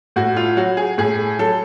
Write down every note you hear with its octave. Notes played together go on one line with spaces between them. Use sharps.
A2 F#4
F4
F#3 F#4
G#4
A2 G#4
F#3 A4